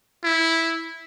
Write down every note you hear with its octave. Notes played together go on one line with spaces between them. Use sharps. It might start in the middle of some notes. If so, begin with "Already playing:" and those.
E4